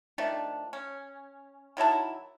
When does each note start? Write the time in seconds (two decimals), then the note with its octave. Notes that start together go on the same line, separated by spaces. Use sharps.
0.18 D#3 F3 A3 D4
0.73 C#4
1.77 D#3 F#3 E4 A5